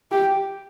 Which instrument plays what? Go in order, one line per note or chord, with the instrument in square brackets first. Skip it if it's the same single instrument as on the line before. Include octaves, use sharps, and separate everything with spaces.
[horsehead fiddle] G4